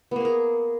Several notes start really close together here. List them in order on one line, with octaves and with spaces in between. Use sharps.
B3 A#3 G#4 A#4